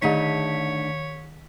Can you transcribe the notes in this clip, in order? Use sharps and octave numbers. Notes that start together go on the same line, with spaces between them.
D3 D#3 A3 D#4 C#5 B6